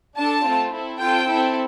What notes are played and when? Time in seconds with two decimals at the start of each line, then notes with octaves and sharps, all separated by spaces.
0.16 D4 A4 A5
0.44 A3 C4 F4
0.72 C4 E4 A4
1.00 C4 F4 A4 G5
1.27 C4 E4 A4